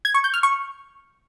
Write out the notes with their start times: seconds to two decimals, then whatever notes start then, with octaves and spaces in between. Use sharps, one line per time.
0.05 G#6
0.14 C#6
0.24 G6
0.34 F6
0.43 C#6